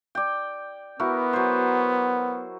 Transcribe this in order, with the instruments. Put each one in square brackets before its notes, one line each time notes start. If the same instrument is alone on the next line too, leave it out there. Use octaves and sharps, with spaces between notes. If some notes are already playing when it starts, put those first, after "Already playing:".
[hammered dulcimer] D5 G5
[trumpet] B3 [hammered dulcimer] E4 F#4 A#4
[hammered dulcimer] F#3 C5